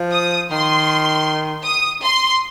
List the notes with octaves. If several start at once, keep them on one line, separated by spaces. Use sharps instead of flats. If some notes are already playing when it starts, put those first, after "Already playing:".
Already playing: F3
D#6
D#3 C6
D#6
C6